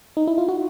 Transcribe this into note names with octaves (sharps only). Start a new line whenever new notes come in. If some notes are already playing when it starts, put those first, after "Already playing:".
D#4
E4
F4
F#4